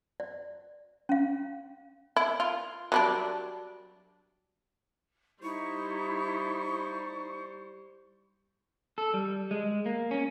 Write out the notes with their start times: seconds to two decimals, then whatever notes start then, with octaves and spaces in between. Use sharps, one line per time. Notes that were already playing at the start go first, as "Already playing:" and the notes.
0.20 D5
1.09 C#4 F5
2.16 E4
2.40 F4
2.92 F#3 G3 D4
5.43 G3 D#4 E4 C5 C#6
8.98 A4
9.14 G3
9.51 G#3
9.86 A#3
10.11 C#4